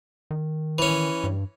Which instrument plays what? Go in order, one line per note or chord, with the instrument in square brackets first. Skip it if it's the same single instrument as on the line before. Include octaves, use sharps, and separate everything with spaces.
[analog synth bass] D#3
[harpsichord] E3 C#4
[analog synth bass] G2